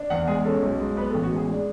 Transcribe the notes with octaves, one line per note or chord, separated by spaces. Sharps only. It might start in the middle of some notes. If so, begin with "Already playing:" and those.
Already playing: D4
E2 F#5
G#3 G#4
C#4 A4
B1
G#3
B3 B4
A4
A1
F#4
G#3 G#4
D4 G#4